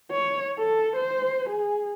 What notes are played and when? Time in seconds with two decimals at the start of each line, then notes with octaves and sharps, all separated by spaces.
0.12 C#5
0.59 A4
0.96 C5
1.50 G#4